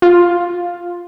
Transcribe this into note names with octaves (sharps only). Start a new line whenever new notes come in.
F4